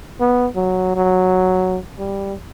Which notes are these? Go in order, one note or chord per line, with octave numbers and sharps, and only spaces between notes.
B3
F#3
F#3
G3